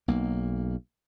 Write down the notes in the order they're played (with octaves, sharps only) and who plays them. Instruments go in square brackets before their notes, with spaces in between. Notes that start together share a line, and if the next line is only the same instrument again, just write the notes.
[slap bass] B1 A#3